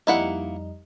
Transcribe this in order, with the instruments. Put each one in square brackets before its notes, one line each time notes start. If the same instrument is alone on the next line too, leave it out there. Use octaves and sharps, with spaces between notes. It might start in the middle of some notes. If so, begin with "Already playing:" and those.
[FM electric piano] F2 G3 D#4 [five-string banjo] A#3 E4 F#5